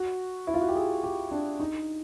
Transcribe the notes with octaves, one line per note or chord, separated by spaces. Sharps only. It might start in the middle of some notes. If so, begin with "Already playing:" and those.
Already playing: F#4
E4
F4
F#4
G4
G#4
G4
D4
D#4